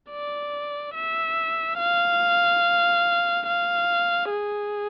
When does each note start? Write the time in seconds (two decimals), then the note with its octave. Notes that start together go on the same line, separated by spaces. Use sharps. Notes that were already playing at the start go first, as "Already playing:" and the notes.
0.11 D5
0.95 E5
1.79 F5
3.47 F5
4.31 G#4